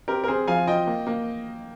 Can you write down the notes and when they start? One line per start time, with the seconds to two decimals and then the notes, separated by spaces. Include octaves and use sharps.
0.08 C4 G4 A#4
0.24 A#4
0.28 C4 G#4 C5
0.47 F3 F5 G#5
0.67 F4 D#5 G5
0.87 A#3
1.07 A#3